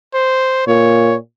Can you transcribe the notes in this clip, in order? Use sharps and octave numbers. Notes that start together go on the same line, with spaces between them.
C5
A#2 C#5